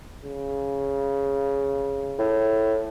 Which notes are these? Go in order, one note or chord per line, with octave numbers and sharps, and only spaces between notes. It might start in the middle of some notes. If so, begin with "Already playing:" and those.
C#3
A2